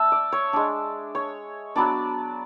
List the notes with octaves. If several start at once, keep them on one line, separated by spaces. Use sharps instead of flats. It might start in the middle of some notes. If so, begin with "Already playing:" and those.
Already playing: A3 D4 E5
D5
C#5
G#3 D4
C#5
F#3 B3 D4 D5